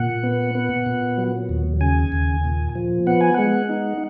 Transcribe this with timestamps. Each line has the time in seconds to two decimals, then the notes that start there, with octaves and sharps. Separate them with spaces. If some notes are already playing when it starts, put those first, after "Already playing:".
Already playing: A#2 F#5
0.23 B3
0.55 B3
0.86 A#2
1.18 F#3
1.49 D#2
1.81 C#3 G#5
2.12 D#2
2.44 A#2
2.75 F3
3.07 B3 F#5
3.21 G#5
3.34 G#3 F#5
3.70 D#4